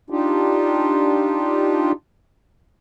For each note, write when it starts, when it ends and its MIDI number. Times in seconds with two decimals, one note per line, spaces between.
0.10 1.92 62
0.10 1.92 63
0.10 1.92 65
0.10 1.92 67